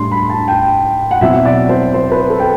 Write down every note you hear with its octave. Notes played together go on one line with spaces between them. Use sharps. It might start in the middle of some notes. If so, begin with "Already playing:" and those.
Already playing: A2 G3 D4 C6
B5
A5
G5
F#5
B2 F#3 C4 E4 E5
D5
C5
C5
B4
A4
G5